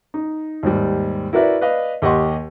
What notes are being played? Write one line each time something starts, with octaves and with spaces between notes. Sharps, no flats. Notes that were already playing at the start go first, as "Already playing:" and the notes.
D#4
D#2 G#2 G3
E4 F#4 A#4 B4 D5 E5
B4 D5 D#5 F5
D#2 G4 D#5 F#5 C6 C#6